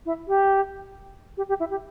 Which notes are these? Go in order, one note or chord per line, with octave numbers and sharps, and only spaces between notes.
E4
G4
G4
G4
E4
G4